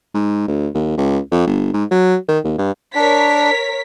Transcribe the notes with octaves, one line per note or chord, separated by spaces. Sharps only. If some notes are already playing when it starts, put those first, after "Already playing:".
G#2
D2
D#2
C#2
F2
G1
G#2
F#3
D#3
D#2
G2
D4 A#4 C#5 B6